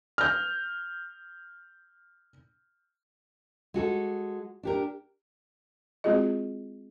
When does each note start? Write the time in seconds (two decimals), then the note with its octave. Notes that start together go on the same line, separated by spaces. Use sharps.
0.18 F6 G6
3.74 G#3 F#4 A4
4.63 D4 G4 A#4
6.04 G#3 C4 F4 F#4 G#4 D#5